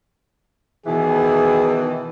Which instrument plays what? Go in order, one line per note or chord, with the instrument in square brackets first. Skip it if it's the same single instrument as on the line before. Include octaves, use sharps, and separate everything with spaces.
[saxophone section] B2 D#3 E3 [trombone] G#4